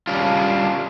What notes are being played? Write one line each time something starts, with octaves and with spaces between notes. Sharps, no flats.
G3 C#4 D4 F4